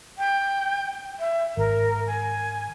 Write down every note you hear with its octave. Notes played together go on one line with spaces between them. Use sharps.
G5
E5
G#1 A#4
G#5